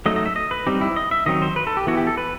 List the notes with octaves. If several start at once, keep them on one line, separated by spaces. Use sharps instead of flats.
F#3 A3 D#4 D#5
D#5
E5
D#5
B4
G3 C4 D#4 G4
E4
D#5
E5
D#3 F#3 C4 D#4 D#5
C5
B4
A4
G4
E3 B3 E4 F#4
G4
A4
B4